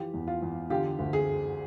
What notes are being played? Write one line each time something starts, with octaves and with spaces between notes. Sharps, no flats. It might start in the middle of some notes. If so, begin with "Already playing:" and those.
Already playing: E3 F3 F4 G4
E2
F4
E2
D3 F4 G4
D2
G#4